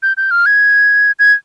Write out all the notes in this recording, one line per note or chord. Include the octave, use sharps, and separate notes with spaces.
G6
G6
F6
G#6
G#6